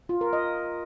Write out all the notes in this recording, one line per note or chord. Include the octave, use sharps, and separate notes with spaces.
F4
A#4
D#5